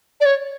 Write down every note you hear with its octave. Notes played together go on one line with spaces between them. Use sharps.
D5
C#5